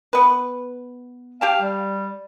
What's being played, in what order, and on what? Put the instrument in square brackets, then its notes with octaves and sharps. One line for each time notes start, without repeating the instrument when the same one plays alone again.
[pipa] B3 B4
[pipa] G4 G5 A5 [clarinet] F5
[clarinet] G3